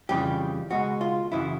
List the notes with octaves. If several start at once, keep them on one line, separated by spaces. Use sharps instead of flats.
F2 C#3 E3 G3 G4
C#2 B2 G#3 F#4
F4
F#2 C#3 E3 E4